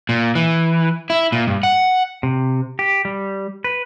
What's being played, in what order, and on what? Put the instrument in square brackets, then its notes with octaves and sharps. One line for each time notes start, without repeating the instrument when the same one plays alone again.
[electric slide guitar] A#2
E3
E4
A#2
G2
F#5
C3
G4
G3
B4